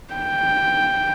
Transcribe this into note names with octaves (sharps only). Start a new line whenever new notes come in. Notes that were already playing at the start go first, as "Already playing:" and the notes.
G5